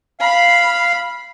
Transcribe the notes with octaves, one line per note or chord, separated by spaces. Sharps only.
F5 B5